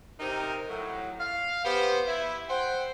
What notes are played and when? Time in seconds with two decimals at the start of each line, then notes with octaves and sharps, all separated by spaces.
0.20 C3 D#4 A#4
0.69 A2 F#3
1.20 F5
1.65 B3 G4 C5
2.07 E4
2.49 C5 F#5 G5